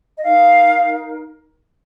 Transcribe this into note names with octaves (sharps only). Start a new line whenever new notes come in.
D#5
D#4 A#4 F5